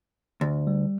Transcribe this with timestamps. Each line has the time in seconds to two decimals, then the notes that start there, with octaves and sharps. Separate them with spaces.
0.41 D2
0.67 G3